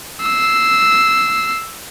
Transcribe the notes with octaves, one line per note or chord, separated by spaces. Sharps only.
E6 C7